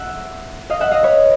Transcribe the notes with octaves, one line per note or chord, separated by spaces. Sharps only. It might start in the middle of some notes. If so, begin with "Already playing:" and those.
Already playing: E5 F#5
D#5 F5
E5 F#5
D#5 F5
B4 C#5